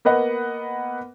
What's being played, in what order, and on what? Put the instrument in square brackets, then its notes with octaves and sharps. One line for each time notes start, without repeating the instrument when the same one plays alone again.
[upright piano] A#3 B3 B4 D#5 F#5